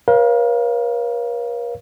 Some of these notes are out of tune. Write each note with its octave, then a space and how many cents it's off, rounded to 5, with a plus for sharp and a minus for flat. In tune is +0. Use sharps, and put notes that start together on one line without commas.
A#4 +40 C#5 -25 F5 -5